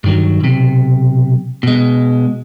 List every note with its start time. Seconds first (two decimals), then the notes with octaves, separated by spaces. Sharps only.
0.04 G2 D#3 F#3
0.40 B1 C3
1.63 B2 G#3